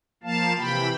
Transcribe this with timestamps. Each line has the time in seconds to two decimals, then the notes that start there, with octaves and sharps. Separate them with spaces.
0.23 F3 A#3 F5 A5
0.58 C3 E3 G5 B5